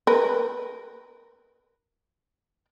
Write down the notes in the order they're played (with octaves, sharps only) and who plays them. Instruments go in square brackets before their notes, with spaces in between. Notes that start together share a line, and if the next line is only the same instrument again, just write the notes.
[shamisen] A#4 B4